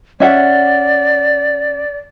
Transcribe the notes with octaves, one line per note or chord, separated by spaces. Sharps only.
C#4 D5 E5 F#5